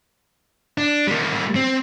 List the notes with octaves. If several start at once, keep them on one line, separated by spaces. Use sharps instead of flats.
D4
G3 A#3
C4